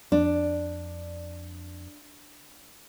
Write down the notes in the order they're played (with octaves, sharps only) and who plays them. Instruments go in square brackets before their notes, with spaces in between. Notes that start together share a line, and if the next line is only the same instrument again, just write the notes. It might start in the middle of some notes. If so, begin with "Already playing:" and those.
[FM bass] F2 [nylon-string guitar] D4